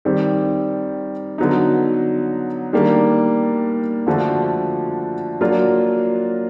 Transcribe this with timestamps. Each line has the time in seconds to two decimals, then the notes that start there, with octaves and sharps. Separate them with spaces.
0.05 D#3 G3 C4
1.38 D3 F#3 B3 D#4
2.73 D#3 G3 A#3 D4
4.07 D3 F3 A3 D4 F#4
5.41 F#3 A#3 D4 F4